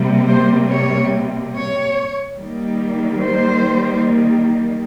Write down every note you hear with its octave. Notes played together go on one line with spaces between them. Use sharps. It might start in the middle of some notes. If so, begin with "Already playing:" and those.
Already playing: C3 G3 A#3
C5
C#5
C#5
D#3 G3 A#3
C5